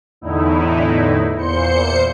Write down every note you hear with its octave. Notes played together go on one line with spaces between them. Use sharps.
E2 A2 D3 D#4 E4
E2 A#2 C5 G6 C#7